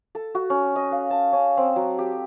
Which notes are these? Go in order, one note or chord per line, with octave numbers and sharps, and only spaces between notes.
A4
F#4
C#4
D#5
F5
A5
C#4
C4
F#3
G4